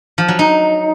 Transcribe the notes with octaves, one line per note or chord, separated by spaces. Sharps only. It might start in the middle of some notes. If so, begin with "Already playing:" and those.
F3
F#3
D#4